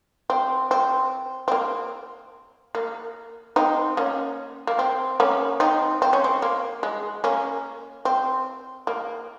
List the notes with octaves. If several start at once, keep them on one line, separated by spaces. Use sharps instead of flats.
C4
C4
C4
A#3
A#3
C4 D#4
A#3 C#4
A#3
C4
A#3 C#4
C4 D#4
C4
C#4
C4
A#3
G#3
A#3 C#4
C4
A#3